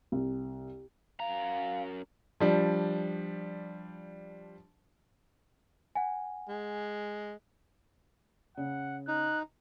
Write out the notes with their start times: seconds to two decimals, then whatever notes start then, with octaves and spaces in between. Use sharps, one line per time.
0.12 C2
1.20 F#2 F5 A#5
2.40 F3 G3 D4
5.95 F#5 G#5
6.48 G#3
8.57 C#3 F#5
9.08 D#4 F#6